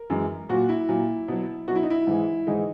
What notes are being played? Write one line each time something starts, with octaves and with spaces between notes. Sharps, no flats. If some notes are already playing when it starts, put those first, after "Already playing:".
Already playing: A#4
F#2 E3 G#3
A#2 F#3 F#4
E4
A#2 F#3
B2 F#3
B2 F#3 F#4
E4
D#4
E4
G#2 E3 G#3
G#2 E3 G#3 D#4